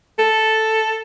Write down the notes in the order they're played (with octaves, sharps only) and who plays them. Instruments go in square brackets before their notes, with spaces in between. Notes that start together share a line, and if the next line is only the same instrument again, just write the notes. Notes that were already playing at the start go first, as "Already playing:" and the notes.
[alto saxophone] A4